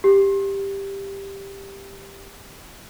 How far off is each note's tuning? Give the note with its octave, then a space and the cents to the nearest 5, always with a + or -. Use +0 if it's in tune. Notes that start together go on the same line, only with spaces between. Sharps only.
G4 +5